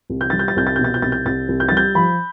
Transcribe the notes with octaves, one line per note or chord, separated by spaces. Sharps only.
C2
G6
G3 A6
G6
A6
C2 G6
A6
B2 G6
A6
G6
C2 A6
G6
C2 A6
C2
G6
G3 A6
G6
F3 B5